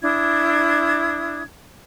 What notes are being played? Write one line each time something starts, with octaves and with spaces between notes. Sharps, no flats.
D4 E4 D#6 G#6